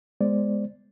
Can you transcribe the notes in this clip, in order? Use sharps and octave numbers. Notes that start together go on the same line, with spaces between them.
G#3 B3 C5 D5